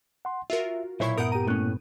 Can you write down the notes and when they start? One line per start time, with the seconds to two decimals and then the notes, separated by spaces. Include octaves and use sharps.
0.25 F#5 C6
0.50 F4 F#4 A#4 E5
1.00 B1 A#2 E4 C5 C#5 E5 B5 G#6
1.18 G2 A#2 B3 A#4 F#5 D#6 G6 D7
1.32 G4 A#5 D#7
1.47 A2 A#3 C#4 F#6